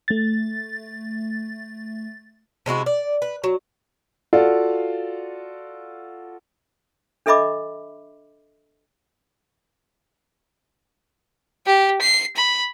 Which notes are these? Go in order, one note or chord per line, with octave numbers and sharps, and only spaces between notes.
A3 A6
C3 G#3 E4 F#4
D5
B4
F#3
F4 F#4 A4 D5 F5
D4 A4 D#5 E5 B5 D6
G4
C7
B5